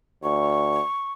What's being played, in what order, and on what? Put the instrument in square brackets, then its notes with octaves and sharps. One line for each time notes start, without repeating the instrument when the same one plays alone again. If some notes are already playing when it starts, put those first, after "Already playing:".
[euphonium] D2 [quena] C#6